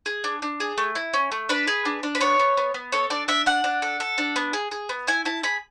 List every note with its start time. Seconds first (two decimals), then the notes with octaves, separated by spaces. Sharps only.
0.06 G#4
0.24 D4
0.42 D4
0.60 G#4
0.78 A3
0.95 E4
1.14 C#4
1.32 A3
1.49 D4 B4
1.67 G#4
1.85 D4
2.03 D4
2.15 B4
2.21 B3 C#5
2.39 B3
2.57 B3
2.74 B3
2.92 A4 C#5
3.10 D4 D5
3.28 D4 E5
3.46 D4 F#5
3.64 D4
3.82 A4
4.00 A4
4.18 D4
4.36 B3
4.53 G#4
4.71 G#4
4.89 B3
5.07 E4 G#5
5.25 E4 A5
5.43 G#4 B5